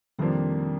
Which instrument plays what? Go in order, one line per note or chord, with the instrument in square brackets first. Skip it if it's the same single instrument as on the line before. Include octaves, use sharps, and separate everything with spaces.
[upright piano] F2 C3 F3 A#3 D4 [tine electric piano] D#3 G3